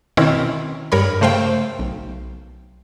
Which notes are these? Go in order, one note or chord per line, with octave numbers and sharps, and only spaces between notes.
B2 D#3 C4 C#4 E4 A#4
G2 A#4 C#5 B5
C#3 A3 C5 F5 G5
B1